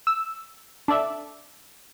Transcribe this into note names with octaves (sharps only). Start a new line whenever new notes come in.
E6
D4 A4 D5 E5